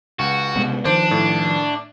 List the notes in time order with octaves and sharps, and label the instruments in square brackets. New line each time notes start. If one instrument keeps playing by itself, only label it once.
[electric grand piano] C#2 [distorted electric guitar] F#4
[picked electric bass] C3 G#3 B3
[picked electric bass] D#3 F3 [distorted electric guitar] D4 [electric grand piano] C5
[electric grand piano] A2